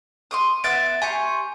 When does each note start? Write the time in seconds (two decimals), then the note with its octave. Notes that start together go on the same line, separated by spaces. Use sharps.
0.31 C6 D6 D#6
0.64 B3 E5 F#6 A6 D7
1.02 G4 G#5 C6 C#6